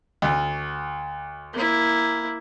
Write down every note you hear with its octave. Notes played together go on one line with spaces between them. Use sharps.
D2
A#3 E4